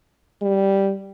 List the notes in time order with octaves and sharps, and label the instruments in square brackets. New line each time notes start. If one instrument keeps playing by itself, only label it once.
[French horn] G3